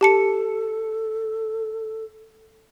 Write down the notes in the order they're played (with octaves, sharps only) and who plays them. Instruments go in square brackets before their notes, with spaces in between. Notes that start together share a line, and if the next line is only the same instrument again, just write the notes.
[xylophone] G4 A5 C#7 [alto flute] A4